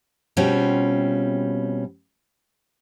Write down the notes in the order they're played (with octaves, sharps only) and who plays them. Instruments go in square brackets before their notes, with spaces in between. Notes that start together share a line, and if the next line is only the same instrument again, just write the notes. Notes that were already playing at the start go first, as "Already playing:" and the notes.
[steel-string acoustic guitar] B2 G3 C4 C#4 F4